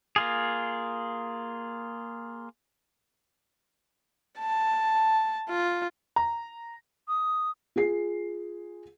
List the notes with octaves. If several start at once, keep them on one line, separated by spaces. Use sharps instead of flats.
A#3 F4 G#4
A5
F4
A#5
D#6
F4 G#4 C7